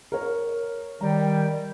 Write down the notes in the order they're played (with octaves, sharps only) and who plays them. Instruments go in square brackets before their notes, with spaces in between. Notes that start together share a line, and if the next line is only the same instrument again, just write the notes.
[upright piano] A#4 C#5
[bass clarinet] D#3 [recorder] G3 [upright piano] A#5